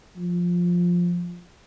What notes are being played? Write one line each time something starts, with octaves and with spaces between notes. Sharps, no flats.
F3